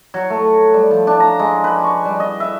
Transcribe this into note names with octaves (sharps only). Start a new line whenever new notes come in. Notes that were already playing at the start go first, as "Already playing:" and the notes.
F#3
A3
G3
F3
D4
A#5
G#3
B4
C#6
G3
D#5
E5